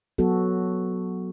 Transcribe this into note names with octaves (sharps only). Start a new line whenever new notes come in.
F#3 B3 F#4 A4